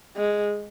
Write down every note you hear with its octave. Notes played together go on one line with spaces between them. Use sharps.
G#3